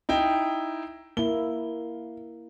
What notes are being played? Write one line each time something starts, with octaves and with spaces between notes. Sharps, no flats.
D#4 E4 G5
A#3 E4 G7